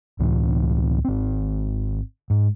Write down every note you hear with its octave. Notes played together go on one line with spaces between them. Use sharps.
C#2 A2 E3
G#1 C4
G#2